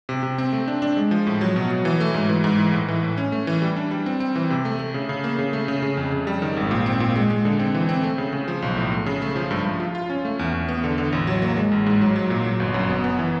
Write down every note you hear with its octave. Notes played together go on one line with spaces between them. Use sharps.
C3
C3
C4
A3
D4
D4
G#3
F3
A2
F#3
B2
F#3
E3
A3
G#2
E3
G#2
E3
A2
E3
A2
C#4
A3
E3
G3
D4
G3
C4
C4
E3
C3
A3
A3
C#3
C#3
A#3
C#3
A3
C#3
C#3
F2
C#3
G3
D#3
G#1
A#2
C4
A#2
G#3
G#3
D3
C4
E3
C4
A3
C#3
C#3
F3
B1
A2
A3
C#3
A3
F3
G2
G2
F4
F4
C#4
A3
E2
E2
B3
D3
D3
A1
F#3
A#3
G#3
A1
G#2
F#3
F#3
A#2
F#3
G1
F#2
B3
B3
E3